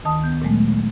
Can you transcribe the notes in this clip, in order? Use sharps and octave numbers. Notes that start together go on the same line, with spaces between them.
D2 D#3 A5 D#6
B3 G6
A#2 F#3 G#3 A3